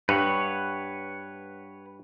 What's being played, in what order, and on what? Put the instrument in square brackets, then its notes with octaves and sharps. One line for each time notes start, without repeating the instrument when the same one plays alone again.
[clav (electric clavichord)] G2 [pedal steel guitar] B4 C#5 F#5